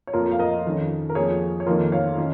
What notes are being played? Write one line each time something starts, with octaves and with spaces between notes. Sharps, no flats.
C#5
F2 F3 A#3 F4 A#4
F5
A#4 D#5
F2 D#3 C#4
A#4
F2 F3 A#3 G#4 C#5
C#5
F2 D#3 A#3 F4 A#4
C#5 F5
D#3 C#4